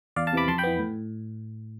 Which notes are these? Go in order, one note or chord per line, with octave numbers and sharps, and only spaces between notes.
E2 D5 F5
F5 A5
C3 E3 B5 D6
F2 A5 C6
G5 B5
E3 B3
A2